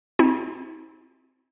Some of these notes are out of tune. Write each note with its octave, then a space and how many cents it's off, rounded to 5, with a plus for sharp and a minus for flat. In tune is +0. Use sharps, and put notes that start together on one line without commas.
C4 +0 E4 -45